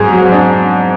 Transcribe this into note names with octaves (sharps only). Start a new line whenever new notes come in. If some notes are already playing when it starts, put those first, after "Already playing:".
Already playing: G#2 F#3 G#4
F#3
D4